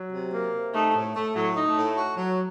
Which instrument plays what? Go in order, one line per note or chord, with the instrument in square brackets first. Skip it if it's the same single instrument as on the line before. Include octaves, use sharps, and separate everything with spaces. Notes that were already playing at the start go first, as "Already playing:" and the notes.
Already playing: [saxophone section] F#3
C3
A#3
C3
[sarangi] A3 [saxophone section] D#4
[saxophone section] A2
A3
[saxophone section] A2 [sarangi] F#3
[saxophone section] D#4
[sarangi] A3
[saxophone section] A2
F#4
F#3